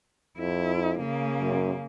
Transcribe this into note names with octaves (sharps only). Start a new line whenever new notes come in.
F2 E4
C#3 A#3
F#2